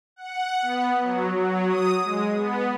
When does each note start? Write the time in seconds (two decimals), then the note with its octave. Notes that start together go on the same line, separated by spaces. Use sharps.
0.16 F#5
0.62 B3
0.99 F#3
1.34 F#3
1.68 D#6
2.03 G#3
2.34 B3